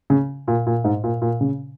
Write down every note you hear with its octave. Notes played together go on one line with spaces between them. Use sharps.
C#3
A#2
A#2
G#2
A#2
A#2
C#3